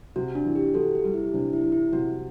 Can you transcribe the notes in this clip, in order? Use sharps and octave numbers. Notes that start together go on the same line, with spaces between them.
C3 F#4
D4
E3
G4
E3 F#4 A4
G4
G3
E4
C3 D4
E4
E3
E4
C3 F#4